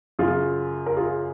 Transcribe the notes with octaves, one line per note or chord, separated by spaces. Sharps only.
F#2 C#3 F4 G#4
A#4
F4 G#4